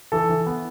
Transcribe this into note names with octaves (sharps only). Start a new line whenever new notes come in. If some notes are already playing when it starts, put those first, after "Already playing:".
E3 A4
E3
B3